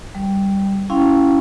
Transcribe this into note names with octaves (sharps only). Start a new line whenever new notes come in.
G3
C#4 E4 F5 G5 C6